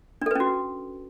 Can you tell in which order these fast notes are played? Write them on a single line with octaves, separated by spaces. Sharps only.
D4 A4 B4 C#4 F#4